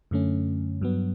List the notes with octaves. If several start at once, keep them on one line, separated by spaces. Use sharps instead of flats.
F#2 D3 A3 C#4
G2 F#3 B3